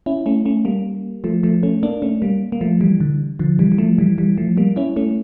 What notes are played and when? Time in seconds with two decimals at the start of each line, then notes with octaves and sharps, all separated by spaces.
0.06 C#4 E4
0.26 A3 C#4
0.45 A3 C#4
0.65 G3 A#3
1.24 F3 A3
1.43 F3 A3
1.63 A3 C#4
1.83 A#3 D4
2.02 A3 C#4
2.22 G3 A#3
2.52 A#3
2.61 F3 A3
2.81 E3 G3
3.00 D3
3.39 D3 F3
3.59 E3 G3
3.72 G3
3.78 F3 A3
3.98 E3 G3
4.18 E3 G3
4.37 F3 A3
4.57 G3 A#3
4.76 C#4 E4
4.96 A3 C#4